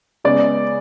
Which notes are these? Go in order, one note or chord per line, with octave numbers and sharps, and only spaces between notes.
C#3 G#3 B3 D5